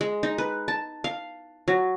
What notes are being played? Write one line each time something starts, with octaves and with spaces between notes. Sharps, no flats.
G#3
D#4
B4
A5
F5
F#3